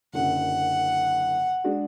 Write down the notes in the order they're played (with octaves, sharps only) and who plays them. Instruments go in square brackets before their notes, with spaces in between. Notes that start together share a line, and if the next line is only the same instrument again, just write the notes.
[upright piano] F#1 F#2 D3 [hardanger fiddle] F#5
[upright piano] G#3 D4 F#4